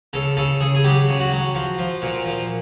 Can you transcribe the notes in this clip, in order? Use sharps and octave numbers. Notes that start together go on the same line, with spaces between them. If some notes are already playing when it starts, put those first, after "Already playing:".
C#3 A4
C#3 A4
C#3 G#4
G#4
F#3 G4
C#3
F#4
F#3
F3
F3
A#2
F3